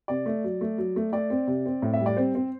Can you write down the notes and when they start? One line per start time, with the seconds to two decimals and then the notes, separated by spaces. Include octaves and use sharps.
0.08 C3 D5
0.26 A3
0.44 F#3
0.61 A3
0.78 F#3
0.96 A3
1.12 A3 D5
1.30 C4
1.47 C3
1.66 C4
1.82 A2
1.93 E5
2.00 G3
2.06 D5
2.17 C4 C5
2.35 C4